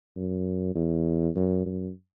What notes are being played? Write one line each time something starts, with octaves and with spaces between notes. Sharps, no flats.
F#2
E2
F#2
F#2